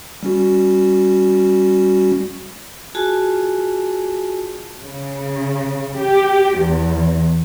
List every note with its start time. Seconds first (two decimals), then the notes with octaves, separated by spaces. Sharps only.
0.23 G3 C#4 F#4
2.95 F4 F#4 G#4 G#5 A5
4.80 C#3
5.97 G4
6.57 E2